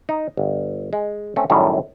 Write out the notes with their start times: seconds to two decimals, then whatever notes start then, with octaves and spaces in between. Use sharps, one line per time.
0.09 D#4
0.37 G1
0.93 G#3
1.36 A3 C4 C#4
1.50 F#2 A2 D#3 G3